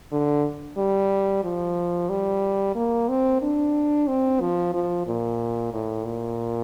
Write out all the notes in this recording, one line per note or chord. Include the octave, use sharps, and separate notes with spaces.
D3
G3
F3
G3
A#3
C4
D4
C4
F3
F3
A#2
A2
A#2